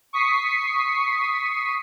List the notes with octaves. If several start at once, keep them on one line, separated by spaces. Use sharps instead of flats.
C#6 D#6 B6 C7